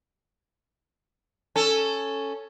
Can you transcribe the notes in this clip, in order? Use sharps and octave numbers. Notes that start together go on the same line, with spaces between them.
C#4 A4